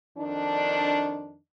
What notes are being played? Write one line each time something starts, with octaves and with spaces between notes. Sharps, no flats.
F2 D#3 D4